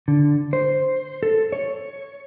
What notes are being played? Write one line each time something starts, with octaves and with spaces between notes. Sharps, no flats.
D3
C5
A4
C#5